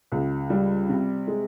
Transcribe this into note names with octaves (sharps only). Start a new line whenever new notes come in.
C#2
G3
C3
G#3